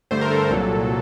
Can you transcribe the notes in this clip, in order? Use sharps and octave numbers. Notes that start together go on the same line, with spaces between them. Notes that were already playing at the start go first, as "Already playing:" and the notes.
G2 D3 A3 C5
A#4
A4
C2 A#2 F#3